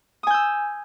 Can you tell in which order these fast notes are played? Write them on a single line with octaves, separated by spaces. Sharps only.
D#6 G#5 G6 E6